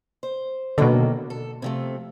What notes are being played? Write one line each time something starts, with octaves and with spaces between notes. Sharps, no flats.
C5
B2 D3 D#3 F#3 A#3
A4
C3 F3 A3